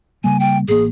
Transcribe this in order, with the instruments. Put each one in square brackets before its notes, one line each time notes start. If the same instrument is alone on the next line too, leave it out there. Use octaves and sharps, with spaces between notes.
[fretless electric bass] C#3 G3 A#3 [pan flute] G#5
[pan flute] G5
[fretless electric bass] A1 A#3 [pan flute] G#4